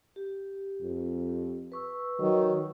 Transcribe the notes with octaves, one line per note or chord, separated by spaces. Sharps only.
G4
F2
B4 C#6 E6
D#3 F#3